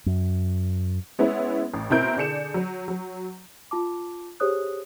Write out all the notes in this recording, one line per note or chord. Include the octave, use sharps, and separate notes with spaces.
F#2
G#3 B3 C#4 E4
A1
B2 C4 E4 A#4 G6 D7
D3 D4 G#4 C#7 E7
F#3
F#3
F4 A5 D6
G4 G#4 C5 C#5 D#6 F#6